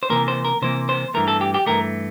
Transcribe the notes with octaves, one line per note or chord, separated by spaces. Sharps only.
C5
C3 E3 A#3 A#4
C5
A#4
C3 E3 A#3 C5
C5
G2 E3 A3 A#4
A4
G4
G4
G2 E3 A3 A#4